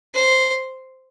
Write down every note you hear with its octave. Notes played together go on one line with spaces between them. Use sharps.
C5